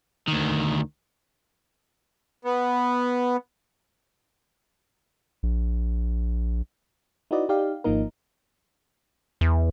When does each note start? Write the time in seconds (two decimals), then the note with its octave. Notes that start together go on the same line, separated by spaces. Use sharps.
0.28 D2 D#3
2.45 B3
5.43 A#1
7.31 D#4 E4 F#4 B4 D5 D#5
7.49 D#4 G4 D5 F5
7.84 G#1 F3 A#3 D#4 A#4
9.41 E2